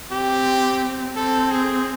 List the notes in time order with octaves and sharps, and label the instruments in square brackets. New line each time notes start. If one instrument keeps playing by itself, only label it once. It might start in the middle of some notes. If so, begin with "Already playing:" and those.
[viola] C4 [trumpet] G4
[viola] C4 [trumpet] A4
[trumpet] G#4